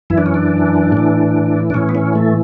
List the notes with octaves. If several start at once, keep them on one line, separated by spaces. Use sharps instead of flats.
F#2 E3 E4
D4
C#4
D4
A2 E3
D4
A2 E3 C#4
B3
C#4
A3